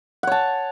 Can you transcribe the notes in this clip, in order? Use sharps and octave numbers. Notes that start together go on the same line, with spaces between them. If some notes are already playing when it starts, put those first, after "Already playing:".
C#5 F#5 A5